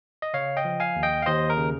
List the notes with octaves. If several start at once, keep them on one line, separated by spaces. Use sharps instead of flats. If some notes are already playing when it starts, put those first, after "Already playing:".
D#5
C#3 C#5 F5
D#5 G5
F3
F5 G#5
D#2
D#5 G5
F5
D#2 C5 D#5
A#4
C#3